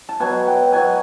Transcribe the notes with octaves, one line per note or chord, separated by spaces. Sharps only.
A5
B2 F#3 G#5
G5
B2 F#3 G#5